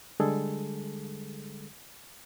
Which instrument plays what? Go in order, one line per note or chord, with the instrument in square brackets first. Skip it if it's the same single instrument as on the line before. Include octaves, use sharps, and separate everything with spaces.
[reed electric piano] D3 G3 G#3 G#4 A4